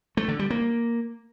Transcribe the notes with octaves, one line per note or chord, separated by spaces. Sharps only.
A3
D3
G3
A#3